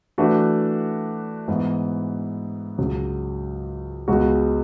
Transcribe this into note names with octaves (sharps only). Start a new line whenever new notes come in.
E3 A3 D4 F#4 B4
G#2 E3 B3
C#2 C#3 F#3
C#2 C#3 G#3 B3 F#4